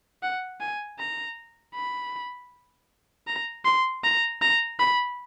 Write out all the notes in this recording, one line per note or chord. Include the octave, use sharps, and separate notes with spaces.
F#5
G#5
A#5
B5
A#5
C6
A#5
A#5
B5